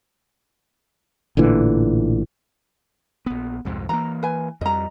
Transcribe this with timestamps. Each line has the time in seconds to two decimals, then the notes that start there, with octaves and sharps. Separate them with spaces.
1.37 A1 A#2 D3 E3
3.26 A#1 B3
3.65 C2 F2 G#2
3.89 E3 F3 A#3 A#5
4.23 B4 G#5
4.61 F2 G3 D#5 A#5